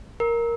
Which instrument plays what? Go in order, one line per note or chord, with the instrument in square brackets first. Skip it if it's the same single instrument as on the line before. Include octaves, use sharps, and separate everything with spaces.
[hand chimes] A#4